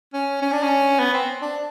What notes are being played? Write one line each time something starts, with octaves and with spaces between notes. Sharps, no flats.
C#4
C#4
D4
C#4
B3
C4
D4